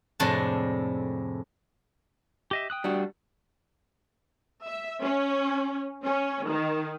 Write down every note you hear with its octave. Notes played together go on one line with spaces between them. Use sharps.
F2 A2 C3 G#3 D4 A5
G4 D#5 E5
G5 D#6 F#6
G3 D4 F#4
E5
C#4
C#4
D#3